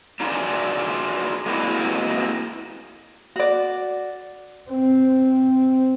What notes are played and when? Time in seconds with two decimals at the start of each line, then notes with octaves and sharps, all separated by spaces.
0.20 D4 D#4 F4 F#4 G#4 D5
1.46 G#3 A#3 C4 D#4 E4 F#4
3.36 F#4 D5
4.69 C4